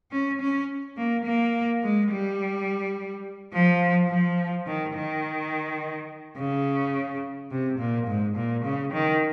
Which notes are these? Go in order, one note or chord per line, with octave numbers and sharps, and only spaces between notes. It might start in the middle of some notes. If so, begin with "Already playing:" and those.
C#4
C#4
A#3
A#3
G#3
G3
F3
F3
D#3
D#3
C#3
C3
A#2
G#2
A#2
C#3
D#3